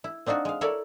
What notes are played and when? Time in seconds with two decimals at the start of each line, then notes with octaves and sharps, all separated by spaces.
0.04 E4
0.26 C4 D4 D#4 F4 F#4
0.45 G#3 F5
0.61 E4 A4 A#4 C#5 D5 E5